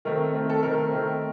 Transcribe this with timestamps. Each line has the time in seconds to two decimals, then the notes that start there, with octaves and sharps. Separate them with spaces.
0.05 D#3 A3 C4 A#4
0.34 D#3 A3 C4
0.50 A4
0.63 D#3 A3 C4 A#4
0.91 D#3 A3 C4